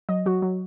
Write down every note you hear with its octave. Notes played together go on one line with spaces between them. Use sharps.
F#3 D#5
F#3 F#4
F#3